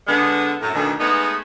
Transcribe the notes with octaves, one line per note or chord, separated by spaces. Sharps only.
D3 G#3 B3
F#2 A2
D2 B2 D#3
G#3 A3 B3 D#4 G#4 B4